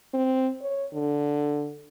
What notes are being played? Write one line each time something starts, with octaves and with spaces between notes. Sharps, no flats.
C4
C#5
D3